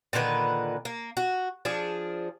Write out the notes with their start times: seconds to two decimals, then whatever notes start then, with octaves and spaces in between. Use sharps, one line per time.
0.13 A#2 D3 D#3 B4
0.85 A#3
1.17 F#4
1.65 F3 D4 G#4